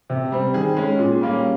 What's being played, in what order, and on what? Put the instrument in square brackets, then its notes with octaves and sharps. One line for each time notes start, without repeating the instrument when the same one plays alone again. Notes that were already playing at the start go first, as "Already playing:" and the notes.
[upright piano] C3
G3 C4
D#3 G#4
G#3 C#4
A#2
G3 A#3 C#4